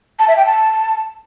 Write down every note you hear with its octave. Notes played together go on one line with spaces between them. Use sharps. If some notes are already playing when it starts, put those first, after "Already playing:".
A5
E5
G5
A5